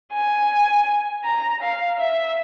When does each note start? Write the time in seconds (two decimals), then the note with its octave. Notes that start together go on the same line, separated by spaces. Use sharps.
0.13 G#5
1.24 A#5
1.62 F5
1.99 E5